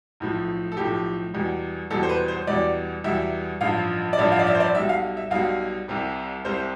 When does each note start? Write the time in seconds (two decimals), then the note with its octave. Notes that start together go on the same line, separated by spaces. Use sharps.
0.20 B1 A2 F3
0.72 A4
0.77 B1 A2 F3 G4
1.34 E2 B2 G3
1.91 E2 B2 G3 A4
2.03 C5
2.09 B4
2.28 C5
2.47 E2 B2 G3 D5
3.04 E2 B2 G3 E5
3.61 A1 G2 F3 F5
4.13 D5
4.18 A1 G2 F3 E5
4.32 F5
4.39 D5
4.47 E5
4.55 C5
4.60 D5
4.74 B1 B2 G3 E5
4.89 F5
5.17 E5
5.31 B1 B2 G3 F5
5.88 C2 C3 G3
6.44 C2 C3 G3 C5